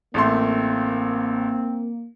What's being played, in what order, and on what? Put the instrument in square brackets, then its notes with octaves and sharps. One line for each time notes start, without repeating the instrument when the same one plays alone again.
[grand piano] A1 A3 C6 [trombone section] A#3 [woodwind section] C4